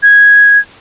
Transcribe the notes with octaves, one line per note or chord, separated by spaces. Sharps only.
G#6